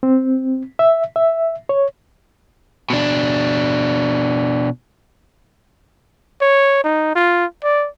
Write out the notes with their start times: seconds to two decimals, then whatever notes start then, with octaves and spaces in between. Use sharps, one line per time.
0.03 C4
0.79 E5
1.16 E5
1.69 C#5
2.90 B2 D4
6.41 C#5
6.84 D#4
7.15 F4
7.63 D5